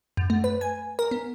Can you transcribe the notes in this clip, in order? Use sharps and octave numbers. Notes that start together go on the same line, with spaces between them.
F#2
A3
B4
G#5
A#4
B3